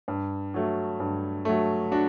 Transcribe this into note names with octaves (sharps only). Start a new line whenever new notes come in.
G2
F#3 A3
G2
F#3 A3
D4 F#4